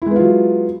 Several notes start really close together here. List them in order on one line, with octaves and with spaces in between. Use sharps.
E4 G#3 B3 F4 F#3